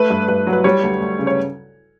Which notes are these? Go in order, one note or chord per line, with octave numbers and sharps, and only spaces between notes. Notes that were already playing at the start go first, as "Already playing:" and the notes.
Already playing: A3 B4
G2
G2 B4
F#3
B4
G3 C#5
D2
D2
C#3
C#5